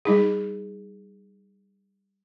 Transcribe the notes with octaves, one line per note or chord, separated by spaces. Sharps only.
G3 D#4 G#4